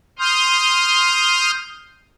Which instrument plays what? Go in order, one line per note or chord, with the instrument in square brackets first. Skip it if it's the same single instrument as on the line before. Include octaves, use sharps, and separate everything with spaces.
[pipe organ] C6 D#6 F6 G6